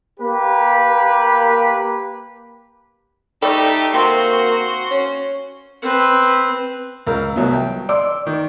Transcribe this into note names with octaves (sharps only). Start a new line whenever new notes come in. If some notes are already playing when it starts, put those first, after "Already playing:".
A#3 G4 B4
G3 A3 D#4 G4 A4 D5
C3 A#3 C4 F#4 C6
C#4
C4 B4
C#2 A#4 E6
C2 F#3 B3
G5
D5 C6 D6 E6
D#3